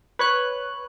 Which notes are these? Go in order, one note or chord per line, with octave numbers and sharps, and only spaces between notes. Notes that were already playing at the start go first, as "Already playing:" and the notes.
B4 C#5 F#6